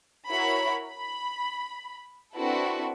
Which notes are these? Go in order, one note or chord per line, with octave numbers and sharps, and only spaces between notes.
E4 F#4 A#4 C#5 B5
B5
C4 D4 E4 F#4 A4 B4